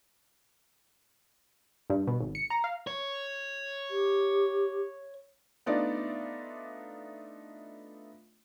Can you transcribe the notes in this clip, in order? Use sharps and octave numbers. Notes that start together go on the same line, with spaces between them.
G2
B2
G#1
C#7
A#5
F5
C#5
G4
A3 B3 D4 D#4 F4 D5